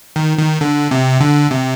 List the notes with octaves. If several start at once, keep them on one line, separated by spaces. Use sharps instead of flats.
D#3
D#3
D3
C3
D3
C3